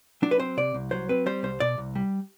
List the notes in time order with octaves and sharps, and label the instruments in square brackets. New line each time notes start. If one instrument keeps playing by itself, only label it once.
[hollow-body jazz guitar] F#3 D4
B4
C4 C5
C3 D5
C2
F#3 C5
C4 B4
G3 C5
C2 C5
B2 D5
C2
G3